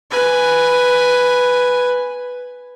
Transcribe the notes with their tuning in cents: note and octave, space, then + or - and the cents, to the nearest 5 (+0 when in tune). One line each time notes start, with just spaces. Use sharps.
B4 +0 G#5 +0